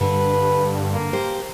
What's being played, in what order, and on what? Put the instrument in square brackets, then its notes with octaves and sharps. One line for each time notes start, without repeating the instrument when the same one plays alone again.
[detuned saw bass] G2 [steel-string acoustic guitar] D3 [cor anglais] B4
[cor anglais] A#3
[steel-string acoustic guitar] G4 C5